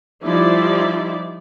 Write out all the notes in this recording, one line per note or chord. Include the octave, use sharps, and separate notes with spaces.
F3 G3 D#4 E4 D5